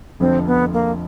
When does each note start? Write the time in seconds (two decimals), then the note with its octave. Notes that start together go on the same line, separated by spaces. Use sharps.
0.20 F1 F2 D3 F3 C4
0.47 B3
0.73 A#3